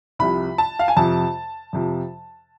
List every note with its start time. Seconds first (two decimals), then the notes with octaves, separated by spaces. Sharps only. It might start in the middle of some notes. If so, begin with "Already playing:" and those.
0.19 C2 C3 F3 B5
0.58 A5
0.79 F5
0.88 G#5
0.97 F2 C3 F3 A5
1.73 F2 C3 F3